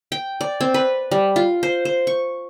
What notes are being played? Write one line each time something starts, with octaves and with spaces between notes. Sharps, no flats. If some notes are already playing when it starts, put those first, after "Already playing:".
G5
D5
C4
B4
G3
F4
C5
C5
C#6